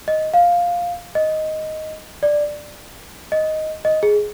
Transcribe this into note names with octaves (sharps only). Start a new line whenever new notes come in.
D#5
F5
D#5
D5
D#5
D#5
G#4